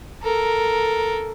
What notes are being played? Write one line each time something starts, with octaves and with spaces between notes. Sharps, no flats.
A4 A#4